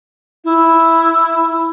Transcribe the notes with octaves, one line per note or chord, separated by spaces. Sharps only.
E4